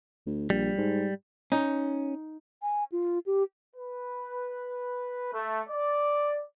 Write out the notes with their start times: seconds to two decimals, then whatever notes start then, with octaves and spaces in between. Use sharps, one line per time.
0.27 D2
0.50 A#1 G3
0.78 G#2
1.52 C#4 D#4
2.62 G#5
2.92 F4
3.26 G4
3.75 B4
5.33 A3
5.68 D5